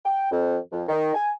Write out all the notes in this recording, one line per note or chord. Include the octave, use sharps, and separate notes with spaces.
G5
F2
F2
D#3
G#5